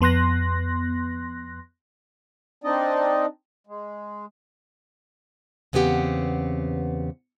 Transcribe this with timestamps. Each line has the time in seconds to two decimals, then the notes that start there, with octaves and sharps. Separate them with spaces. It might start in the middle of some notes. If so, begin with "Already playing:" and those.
0.01 F2 B3 C6 F#6 A#6
2.64 C4 D4 D#4 D5 D#5
3.67 G#3
5.73 E2 C#3 B3 C4 G4 F#5